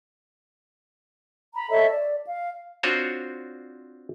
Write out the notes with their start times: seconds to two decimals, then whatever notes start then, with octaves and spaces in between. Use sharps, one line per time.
1.54 A#5 B5
1.70 A4 C#5 D#5 E5
1.90 D5
2.25 F5
2.83 C4 D4 F4 F#4 C5 C#5